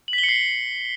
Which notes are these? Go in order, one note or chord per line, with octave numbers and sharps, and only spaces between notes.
F#7
B6
G7
C#7
C7